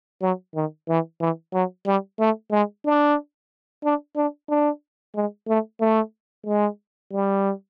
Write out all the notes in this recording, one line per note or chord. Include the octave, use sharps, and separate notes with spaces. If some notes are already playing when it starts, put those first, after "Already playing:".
F#3
D#3
E3
E3
F#3
G3
A3
G#3
D4
D4
D4
D4
G#3
A3
A3
G#3
G3